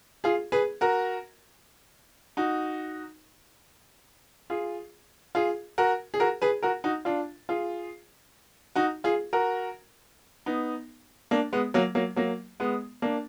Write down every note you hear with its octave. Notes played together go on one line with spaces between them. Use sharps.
F4 G#4
G#4 B4
F#4 A#4
D#4 F#4
F4 G#4
F4 G#4
F#4 A#4
G#4
F#4 A#4
G#4 B4
F#4 A#4
D#4 F#4
D4 F4
F4 G#4
D#4 F#4
F4 G#4
F#4 A#4
B3 D#4
A#3 D4
G#3 B3
F#3 A#3
F#3 A#3
F#3 A#3
G#3 B3
A#3 D4